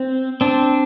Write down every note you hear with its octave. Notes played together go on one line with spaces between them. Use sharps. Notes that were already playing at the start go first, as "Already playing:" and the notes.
Already playing: C4
C4 D4